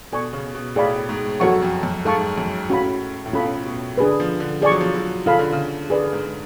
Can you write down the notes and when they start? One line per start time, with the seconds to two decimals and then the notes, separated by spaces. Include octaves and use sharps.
0.12 B2 A4 D5 G#5 C#6
0.33 C#3
0.54 B2
0.76 A2 G#4 D5 F5 B5
1.09 G#2
1.40 F#2 F#4 A4 C#5 F#5 C#6
1.62 F2
1.83 F#2
2.05 G#2 A4 F5 A5 C#6
2.38 F#2
2.70 A2 C#4 F#4 A4 F5 B5
3.26 A2
3.33 B2 C#4 F4 A4 F5 B5
3.66 B2
3.98 D3 D4 G#4 B4
4.20 F3
4.40 D3
4.62 F3 G#4 D5 G#5 C#6
4.71 F#3
4.81 F3
4.95 F#3
5.26 C#3 F4 A4 F5 B5
5.39 D3
5.52 C#3
5.90 D3 G#4 B4 D5 G#5
6.12 G#2